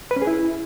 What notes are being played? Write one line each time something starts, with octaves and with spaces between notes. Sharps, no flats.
B4
C#4
G#4
E4